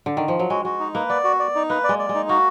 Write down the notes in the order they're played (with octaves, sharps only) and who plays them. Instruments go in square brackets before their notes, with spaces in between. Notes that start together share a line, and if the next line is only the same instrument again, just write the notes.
[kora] D3
D#3
F3
F#3
[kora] G#3 [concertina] F#4
[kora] G#3 [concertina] F#4
[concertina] D#4
[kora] A#3 [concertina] B4
[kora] B3 [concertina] D5
[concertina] F#4
D5
D#4
[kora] A#3 [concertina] B4
[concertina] D5
[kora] G#3
[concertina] D5
[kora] G#3
[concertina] D#4
[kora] A#3 [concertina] F#4